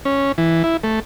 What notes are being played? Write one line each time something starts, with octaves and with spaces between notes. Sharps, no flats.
C#4
E3
E4
A3